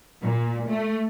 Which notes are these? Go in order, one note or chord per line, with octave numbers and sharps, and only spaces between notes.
A#2
A3